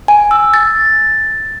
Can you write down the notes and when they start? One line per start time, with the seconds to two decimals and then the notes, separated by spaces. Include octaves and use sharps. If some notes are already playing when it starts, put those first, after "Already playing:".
0.08 G#5
0.31 E6
0.54 A6